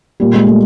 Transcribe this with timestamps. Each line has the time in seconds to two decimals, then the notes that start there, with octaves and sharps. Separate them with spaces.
0.20 A#2 G3
0.34 G#3
0.47 A3